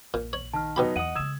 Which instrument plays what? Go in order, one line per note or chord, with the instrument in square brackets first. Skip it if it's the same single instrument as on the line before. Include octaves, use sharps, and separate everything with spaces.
[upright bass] A#1 [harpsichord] A#2
[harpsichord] C#5 [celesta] F#7
[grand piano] D#3 [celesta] A5 F6
[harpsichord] B2 G4 B5 [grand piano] F#3 B3 D#4
[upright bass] E2 [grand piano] D#5 F#5 F#7 [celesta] D#6 D#7
[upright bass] C#3 G#3 [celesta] D#6 E6 E7 [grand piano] G#6